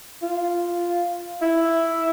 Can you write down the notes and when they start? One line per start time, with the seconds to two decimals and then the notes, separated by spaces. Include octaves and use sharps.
0.23 F4
1.42 E4